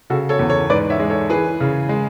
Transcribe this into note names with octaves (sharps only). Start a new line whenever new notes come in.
C#3 F#4 A4
A4 C#5
E2
A4 C#5
G#2 B4 D5
C#5 E5
G#3
A4 C#5
E3 G#4 B4
C#3
G#3